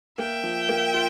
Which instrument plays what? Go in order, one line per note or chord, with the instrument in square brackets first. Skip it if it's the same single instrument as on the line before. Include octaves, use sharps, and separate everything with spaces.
[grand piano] A#3 [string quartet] E5 G5
[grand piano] F3
A#3
F4